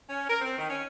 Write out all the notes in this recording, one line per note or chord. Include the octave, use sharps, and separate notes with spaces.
C#4
A#4
C4
D#3
C#4